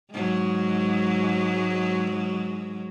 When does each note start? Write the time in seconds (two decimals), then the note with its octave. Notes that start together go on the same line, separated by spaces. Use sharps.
0.12 G#2 F#3 G#3